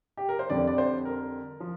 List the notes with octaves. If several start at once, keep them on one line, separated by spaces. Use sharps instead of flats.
G4
A#4
C5
F2 D3 G3 D5
D5
C5
A#4
F3